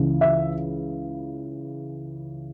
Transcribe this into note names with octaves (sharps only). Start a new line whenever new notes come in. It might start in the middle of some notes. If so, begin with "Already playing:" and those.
Already playing: C#2 C#3 E3
E5